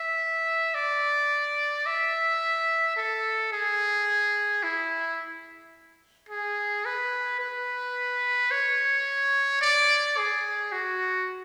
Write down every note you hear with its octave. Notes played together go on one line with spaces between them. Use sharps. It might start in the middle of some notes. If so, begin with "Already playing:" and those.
Already playing: E5
D5
E5
A4
G#4
E4
G#4
B4
B4
C#5
D5
G#4
F#4